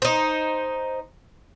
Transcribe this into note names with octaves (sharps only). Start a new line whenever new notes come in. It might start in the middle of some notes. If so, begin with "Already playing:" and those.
D#4 C5